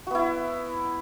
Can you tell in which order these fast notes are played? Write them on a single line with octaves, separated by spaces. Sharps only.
F#4 B3 E4